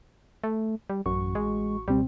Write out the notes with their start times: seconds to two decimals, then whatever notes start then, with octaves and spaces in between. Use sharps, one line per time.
0.44 A3
0.90 G3
1.06 A1 F#2 F#4 C#6
1.35 G#3
1.88 C#2 B2 G3 C4